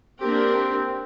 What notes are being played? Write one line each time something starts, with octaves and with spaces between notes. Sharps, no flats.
A#3 C4 D4 G4 A#4